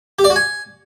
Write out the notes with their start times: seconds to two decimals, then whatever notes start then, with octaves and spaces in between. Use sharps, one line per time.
0.19 G4
0.24 D5
0.30 F#4
0.36 G#5